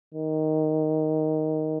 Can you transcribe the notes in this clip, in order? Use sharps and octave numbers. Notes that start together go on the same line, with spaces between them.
D#3